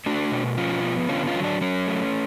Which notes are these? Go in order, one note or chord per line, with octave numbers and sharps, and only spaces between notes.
A3 D4 F#4
B2
F3 C#4 F4
B3
D3 C#4 F4
C#4 F4
F#3
D4
F#3 C#4
A3